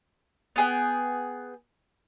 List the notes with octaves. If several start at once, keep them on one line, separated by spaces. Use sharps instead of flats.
B3 G#4 G5